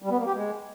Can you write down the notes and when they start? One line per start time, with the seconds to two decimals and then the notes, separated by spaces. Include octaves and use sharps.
0.02 G3
0.10 B3
0.19 A#3
0.27 G4
0.35 G#3